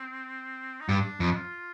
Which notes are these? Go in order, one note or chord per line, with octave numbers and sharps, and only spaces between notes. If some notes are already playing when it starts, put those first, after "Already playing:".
Already playing: C4
D#4
G2 D4
F2
F4